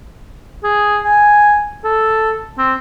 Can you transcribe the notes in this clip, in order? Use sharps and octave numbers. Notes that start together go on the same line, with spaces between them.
G#4
G#5
A4
C4